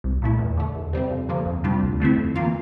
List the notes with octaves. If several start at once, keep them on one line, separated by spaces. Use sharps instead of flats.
C2
A#2 A3 E4
E2
D3 A3
E2
C3 G3 C4
F2
D3 F3 A#3
F2
C3 G3 D4 F4
D2
D3 A3 C4 E4
F2
E3 A#3 F4